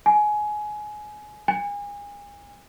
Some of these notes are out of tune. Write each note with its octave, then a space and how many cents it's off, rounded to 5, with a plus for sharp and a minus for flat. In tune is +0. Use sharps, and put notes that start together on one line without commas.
G#5 +20
G#5 -35